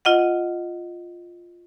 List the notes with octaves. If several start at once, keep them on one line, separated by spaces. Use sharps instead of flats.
F4 D#5 F#5